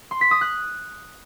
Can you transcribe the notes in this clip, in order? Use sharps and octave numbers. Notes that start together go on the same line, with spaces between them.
C6
B6
D#6
F#6